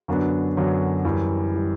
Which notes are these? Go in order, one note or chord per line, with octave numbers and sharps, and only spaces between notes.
F#2 D3 F#3 B3 D4
F#2 D3 F#3 B3 D4
F#2 E3 G3
E3 G3